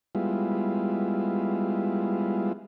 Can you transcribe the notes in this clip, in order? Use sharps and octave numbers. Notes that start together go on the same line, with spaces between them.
G3 G#3 B3 E4 F4